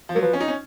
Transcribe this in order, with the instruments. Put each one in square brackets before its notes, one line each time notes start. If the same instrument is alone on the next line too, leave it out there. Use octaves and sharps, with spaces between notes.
[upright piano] F3
[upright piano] F#3 [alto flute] A#4
[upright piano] F3 [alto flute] B4
[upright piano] C#4
D#4
C#4